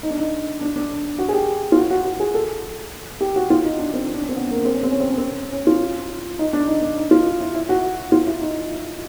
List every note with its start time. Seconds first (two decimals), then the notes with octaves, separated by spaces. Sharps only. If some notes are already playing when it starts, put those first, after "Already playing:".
0.03 D#4
0.10 D4
0.18 D#4
0.61 D4
0.76 D4
1.18 F#4
1.29 G#4
1.33 G4
1.72 F4
1.77 F#4
1.91 F#4
2.05 F#4
2.20 G#4
2.34 A4
3.21 G4
3.36 F#4
3.50 F4
3.64 D#4
3.79 D4
3.94 C4
4.14 D4
4.22 C#4
4.29 C4
4.37 B3
4.51 A#3
4.65 C4
4.74 C#4
4.83 C4
4.91 C#4
5.00 C4
5.09 C#4
5.18 C4
5.52 C#4
5.67 F4
6.39 D#4
6.53 D4
6.67 D#4
6.82 D4
6.97 D#4
7.11 F4
7.41 E4
7.55 E4
7.69 F#4
8.12 F4
8.27 E4
8.41 D#4